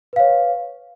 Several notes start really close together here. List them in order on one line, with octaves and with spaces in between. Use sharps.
B4 F5 C#5